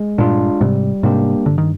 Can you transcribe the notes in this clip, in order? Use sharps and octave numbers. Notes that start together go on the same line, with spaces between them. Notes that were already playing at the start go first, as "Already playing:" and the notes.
Already playing: G#3
G2 A#2 D4 F4
G#2 C3 G3
G#2 C3 A#3 D4 G4
G2 D3
D#3